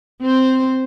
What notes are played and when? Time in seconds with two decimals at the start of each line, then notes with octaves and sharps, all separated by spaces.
0.21 C4 C5